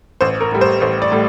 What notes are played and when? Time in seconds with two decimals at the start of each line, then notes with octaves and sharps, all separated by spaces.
0.21 A1 C5
0.41 A#4
0.52 A2 G3
0.61 C5
0.81 A1 C5
1.02 D5
1.12 A2 G3